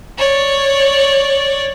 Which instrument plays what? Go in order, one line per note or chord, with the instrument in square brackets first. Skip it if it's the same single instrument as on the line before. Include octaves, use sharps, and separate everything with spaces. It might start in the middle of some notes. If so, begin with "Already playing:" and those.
[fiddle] C#5 D5